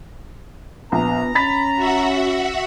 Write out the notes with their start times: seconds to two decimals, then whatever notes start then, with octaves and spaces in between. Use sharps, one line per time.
0.92 A#1 B3 A#5
1.35 C#4 B5 A6 B6
1.76 F#4 E5 F#5